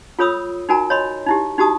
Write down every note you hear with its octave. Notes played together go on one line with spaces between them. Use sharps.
F4 A4 C#5 B5 D#6 E6
D#4 F#4 A#4 G#5 A#5
C#5 D#5 B5 C6
D#4 E4 G4
D#4 F#4 G4 A5 D#6